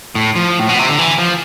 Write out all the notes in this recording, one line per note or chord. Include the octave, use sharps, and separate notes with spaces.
A2
F3
A2
B2
C3
D3
E3
F3